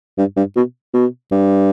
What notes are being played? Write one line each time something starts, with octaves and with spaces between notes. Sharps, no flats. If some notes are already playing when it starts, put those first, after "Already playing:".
G2
G2
B2
B2
G2